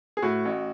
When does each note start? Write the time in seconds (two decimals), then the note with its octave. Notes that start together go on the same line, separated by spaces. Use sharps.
0.17 G#4
0.22 A2 F#4
0.45 A1